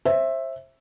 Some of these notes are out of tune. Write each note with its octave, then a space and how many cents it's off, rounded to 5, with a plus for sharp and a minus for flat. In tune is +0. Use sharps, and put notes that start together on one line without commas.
C5 +30 E5 +0